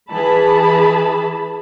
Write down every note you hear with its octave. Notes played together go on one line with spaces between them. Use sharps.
E3 G#4 A5 B5